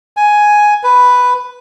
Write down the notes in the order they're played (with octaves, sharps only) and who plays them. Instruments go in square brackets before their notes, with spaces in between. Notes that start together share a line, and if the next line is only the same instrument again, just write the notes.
[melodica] G#5
B4